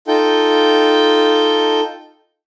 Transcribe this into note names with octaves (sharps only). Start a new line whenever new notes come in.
D#4 F4 A4 G5